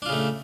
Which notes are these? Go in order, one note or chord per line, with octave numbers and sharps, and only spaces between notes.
C#3 A3 D4 F4